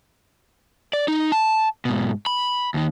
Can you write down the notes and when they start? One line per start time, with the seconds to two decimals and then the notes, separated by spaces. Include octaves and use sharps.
0.93 D5
1.08 D#4
1.32 A5
1.85 G#2 B2
2.26 B5
2.74 D#2 D#3